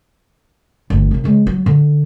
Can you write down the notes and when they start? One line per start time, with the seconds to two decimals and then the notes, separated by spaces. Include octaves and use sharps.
0.90 G1 D2
1.11 C2 F#3
1.24 C#3 G#3
1.47 F#3
1.66 D3